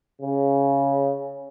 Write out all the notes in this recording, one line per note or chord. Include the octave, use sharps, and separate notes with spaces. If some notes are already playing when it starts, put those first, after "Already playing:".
C#3